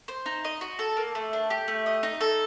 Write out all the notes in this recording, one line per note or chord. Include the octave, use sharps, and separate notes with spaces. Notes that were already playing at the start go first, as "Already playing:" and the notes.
C5
D#4
D#5
F#4
A4
A#3
A3
D4
G4
A3
D#5
D#4
A4